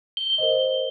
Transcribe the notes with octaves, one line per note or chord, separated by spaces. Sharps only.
G7
A#4 C5 D#5